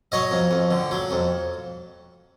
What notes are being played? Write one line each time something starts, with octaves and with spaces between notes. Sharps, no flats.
F#3 C#5 D#5
F2
F2
D3
F#3
F2